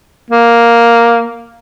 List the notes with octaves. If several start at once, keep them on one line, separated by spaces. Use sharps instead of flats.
A#3